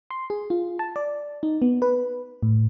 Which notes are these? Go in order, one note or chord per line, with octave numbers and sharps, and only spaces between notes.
C6
G#4
F4
A5
D5
D#4
B3
B4
A2